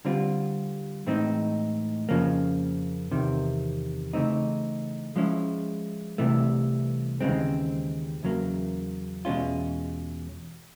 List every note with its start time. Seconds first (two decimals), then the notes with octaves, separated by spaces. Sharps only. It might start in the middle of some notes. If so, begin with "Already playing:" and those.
0.05 D3 G3 C4 F4
1.07 A2 E3 G#3 C4 D#4
2.09 F2 C#3 F3 A#3
3.11 E2 C3 D#3
4.13 C#3 E3 A3 C4 D#4
5.16 F3 G#3 C#4 E4
6.18 C2 C3 E3 A3
7.21 D#2 C#3 E3 G#3 C4
8.23 E2 C#3 F#3 A#3
9.25 E2 B2 G#3 C#4 F4